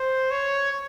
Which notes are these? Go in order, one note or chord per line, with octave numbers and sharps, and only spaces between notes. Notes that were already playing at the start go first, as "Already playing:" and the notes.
Already playing: C5
C#5